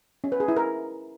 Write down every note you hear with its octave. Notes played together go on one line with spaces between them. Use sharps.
C#4
B4
G#4
E4
A#4